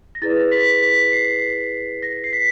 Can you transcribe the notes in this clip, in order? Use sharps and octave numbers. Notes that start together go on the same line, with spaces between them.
A#6
E4 G#4 B4 D5 A6
B6
B6
C7
A#6
C7
B6